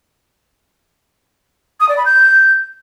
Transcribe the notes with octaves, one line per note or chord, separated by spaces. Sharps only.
D#6
D5
B5
G6